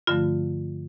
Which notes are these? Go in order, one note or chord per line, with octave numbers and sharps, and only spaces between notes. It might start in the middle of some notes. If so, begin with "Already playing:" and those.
G2 D3 F3 A3 F4